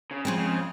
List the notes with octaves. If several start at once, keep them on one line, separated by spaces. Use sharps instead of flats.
C#3
F3 G#3 C4
C#3